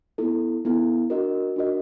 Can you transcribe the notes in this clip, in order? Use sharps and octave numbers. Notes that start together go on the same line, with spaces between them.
B3 E4 A4
B3 E4 A4
D4 F#4 A#4 D#5
D4 F#4 A#4 D#5